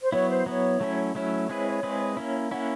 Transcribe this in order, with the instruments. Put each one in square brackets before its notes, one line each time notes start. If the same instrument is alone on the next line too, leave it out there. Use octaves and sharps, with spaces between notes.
[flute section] C5
[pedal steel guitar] F#3 B3 E4 [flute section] C#5
[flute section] C5
[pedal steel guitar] F#3 B3 E4 [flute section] C#5
[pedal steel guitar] F#3 A3 C#4 E4
[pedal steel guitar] F#3 A3 C#4 E4 [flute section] C#5
[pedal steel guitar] G#3 C4 E4 G#4 B4
G#3 C4 E4 G#4 B4
A#3 C#4 E4
[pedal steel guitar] A#3 C#4 E4 [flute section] F#5